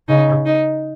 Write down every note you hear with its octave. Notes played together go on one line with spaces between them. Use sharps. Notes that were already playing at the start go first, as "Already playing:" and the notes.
C#3 D#4
D#4